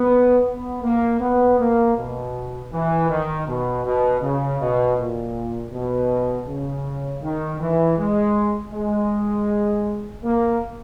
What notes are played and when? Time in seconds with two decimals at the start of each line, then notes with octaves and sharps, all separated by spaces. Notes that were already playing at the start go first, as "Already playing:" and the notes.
Already playing: B3
0.46 B3
0.83 A#3
1.21 B3
1.59 A#3
1.96 B2
2.72 E3
3.10 D#3
3.47 B2
3.84 B2
4.22 C#3
4.60 B2
4.97 A#2
5.73 B2
6.48 C#3
7.22 D#3
7.61 E3
7.99 G#3
8.74 G#3
10.24 A#3